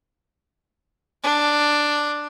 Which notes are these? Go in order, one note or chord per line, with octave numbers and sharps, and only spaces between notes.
D4